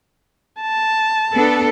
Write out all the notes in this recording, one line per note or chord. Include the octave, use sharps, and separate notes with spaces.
A5
B3 D4 A4